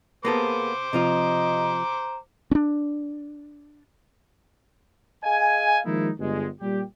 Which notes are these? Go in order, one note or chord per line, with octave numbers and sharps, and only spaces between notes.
A#3 B3 G#4 A4 C5 D6
C3 F3 F4 D#5 A#5
C#4 D4
G#4 D#5 F5 G#5
D#3 F3 G#3 A#3 D#4 E4
G1 G#3
A#2 G3 G4